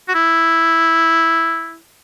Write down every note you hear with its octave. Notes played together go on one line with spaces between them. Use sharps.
F#4
E4